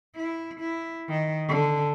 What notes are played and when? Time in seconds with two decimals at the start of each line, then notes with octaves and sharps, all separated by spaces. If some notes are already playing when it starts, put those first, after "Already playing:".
0.15 E4
0.60 E4
1.09 D#3
1.49 D3